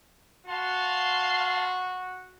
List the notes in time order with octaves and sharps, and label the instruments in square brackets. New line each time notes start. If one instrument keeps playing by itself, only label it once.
[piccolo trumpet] F#4 [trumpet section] F5 A5 C6